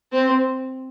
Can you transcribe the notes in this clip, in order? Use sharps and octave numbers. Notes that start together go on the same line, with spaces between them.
C4